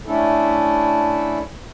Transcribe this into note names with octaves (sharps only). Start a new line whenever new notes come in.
A3 C#4 D4 E4 A4